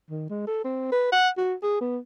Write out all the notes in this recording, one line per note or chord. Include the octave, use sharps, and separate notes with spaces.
D#3
G#3
A4
C4
B4
F#5
F#4
G#4
B3